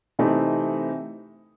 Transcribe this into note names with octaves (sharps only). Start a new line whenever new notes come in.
C3 E3 A3 C4 D#4